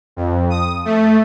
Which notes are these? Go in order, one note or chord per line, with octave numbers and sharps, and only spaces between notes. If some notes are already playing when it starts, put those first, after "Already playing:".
F2
D#6
A3